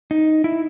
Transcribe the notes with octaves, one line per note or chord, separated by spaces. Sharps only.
D#4
E4